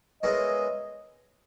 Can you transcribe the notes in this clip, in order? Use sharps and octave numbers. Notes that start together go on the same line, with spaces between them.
G#3 B3 E4 A#4 C#5 D#5